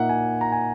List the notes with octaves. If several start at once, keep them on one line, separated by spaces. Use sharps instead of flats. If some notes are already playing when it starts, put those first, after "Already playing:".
Already playing: A#2 A#3 D#4 E5 F#5
G#5
A#5
G#5